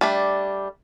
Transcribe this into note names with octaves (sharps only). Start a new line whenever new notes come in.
G3 A3 D4